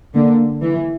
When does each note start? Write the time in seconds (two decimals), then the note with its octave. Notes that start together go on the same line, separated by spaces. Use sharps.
0.14 D3 A#3
0.62 E3